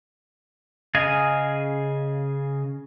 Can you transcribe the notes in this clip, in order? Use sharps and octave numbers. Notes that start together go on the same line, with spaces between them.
C#3 G#4 D#5 F5 G#5